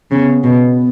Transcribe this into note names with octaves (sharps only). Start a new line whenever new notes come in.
C#3 B3 C4
B2 B3